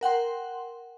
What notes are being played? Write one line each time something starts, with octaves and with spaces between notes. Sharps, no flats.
A#4 F#5 G5 C6